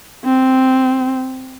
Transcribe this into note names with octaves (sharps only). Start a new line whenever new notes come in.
C4